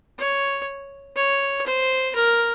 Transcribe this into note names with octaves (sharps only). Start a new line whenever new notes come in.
C#5
C#5
C5
A#4